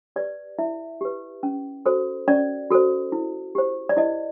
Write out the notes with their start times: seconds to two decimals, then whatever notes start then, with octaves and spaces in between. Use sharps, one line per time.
0.16 G4 B4 D5
0.59 E4 E5
1.01 G4 B4
1.43 C#4
1.85 F#4 A4 C5
2.28 C#4 D5
2.70 F#4 A4 C5
3.12 E4
3.55 G4 C5
3.89 D5
3.97 E4 D#5